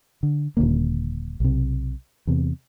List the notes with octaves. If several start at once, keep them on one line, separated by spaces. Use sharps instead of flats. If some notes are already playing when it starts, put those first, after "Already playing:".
D3
D#1 F#2 D3 A#3
B1 C3
E2 C3